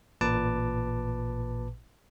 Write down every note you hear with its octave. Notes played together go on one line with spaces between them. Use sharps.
A1 A#2 B4 A5 D6